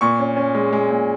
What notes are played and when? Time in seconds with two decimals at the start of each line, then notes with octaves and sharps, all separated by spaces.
0.01 A#2 C#6
0.19 C#4
0.37 C#4
0.55 G#3
0.73 G#3
0.90 A#2